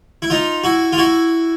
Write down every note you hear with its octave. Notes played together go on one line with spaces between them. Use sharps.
E4
D#4 F4
E4 F#4
F4
E4 F#4